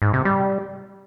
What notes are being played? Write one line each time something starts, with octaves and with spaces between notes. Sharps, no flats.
G#2
C3
G3